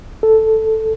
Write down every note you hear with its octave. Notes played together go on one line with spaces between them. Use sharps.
A4